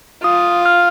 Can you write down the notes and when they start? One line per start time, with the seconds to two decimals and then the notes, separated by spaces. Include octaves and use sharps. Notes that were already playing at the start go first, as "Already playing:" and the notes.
0.24 F4 D#6
0.66 F6